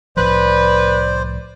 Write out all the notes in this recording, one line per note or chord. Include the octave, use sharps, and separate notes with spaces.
C2 A2 F3 B4 C5 D5